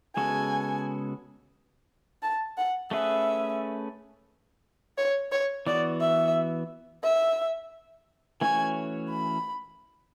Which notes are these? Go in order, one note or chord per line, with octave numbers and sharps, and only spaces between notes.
C#3 G#3 B3 F#4 A4 G#5
A5
F#5
A3 C#4 G#4 B4 E5
C#5
C#5
E3 B3 F#4 D5
E5
E5
E3 A3 C#4 F#4 C#5 G#5
B5